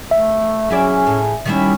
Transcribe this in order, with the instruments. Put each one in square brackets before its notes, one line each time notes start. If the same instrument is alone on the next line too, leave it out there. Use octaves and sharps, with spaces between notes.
[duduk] A3 [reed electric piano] E5
[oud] F#3 E4 D5 [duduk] C#4 [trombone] G#4
[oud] A2
[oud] D#3 G3 E4 [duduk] C#4